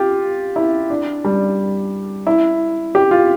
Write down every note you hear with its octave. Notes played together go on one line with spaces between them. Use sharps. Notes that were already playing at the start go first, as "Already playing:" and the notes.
Already playing: F4 G4
E4
D4
G3
E4
G4
F4